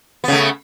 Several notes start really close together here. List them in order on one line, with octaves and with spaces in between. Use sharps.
B3 C#3 A3